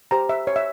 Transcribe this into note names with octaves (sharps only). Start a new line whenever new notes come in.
G4 C5 A#5
E5
C#5
E5